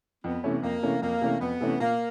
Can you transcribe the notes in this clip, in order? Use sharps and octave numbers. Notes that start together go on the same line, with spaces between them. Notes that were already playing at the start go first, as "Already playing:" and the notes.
F2 B3
C3 E3 A3 C#4
F2 A#3
C3 E3 A3 C#4
F2 A#3
C3 E3 A3 C#4
F2 B3
C3 E3 A3 C#4
A#2 A#3